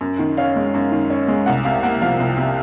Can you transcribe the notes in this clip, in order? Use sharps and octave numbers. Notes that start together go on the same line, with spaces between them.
F#2
D#3
C#4 F5
G#3
F#2
D#3
C#4
G#3
C2 F#5
C3 F5
A#3 F#5
F3 F5
C2
C3